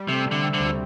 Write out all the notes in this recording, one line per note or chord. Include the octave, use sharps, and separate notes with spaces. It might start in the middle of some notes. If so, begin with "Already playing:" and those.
Already playing: G3
C3 A3
C3
D3
C4
D3
D2